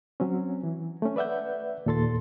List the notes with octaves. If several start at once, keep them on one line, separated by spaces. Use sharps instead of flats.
F#3 C4 C#4
E3
A3 C#4
B4 D5 E5 F#5 G6
D#2 A#2 A4 C6 A6